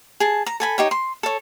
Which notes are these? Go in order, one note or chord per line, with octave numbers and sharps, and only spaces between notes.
G#4 A5
A#5
A4 G#5 B5
D#4 G4 C#5
C6
A4 C#5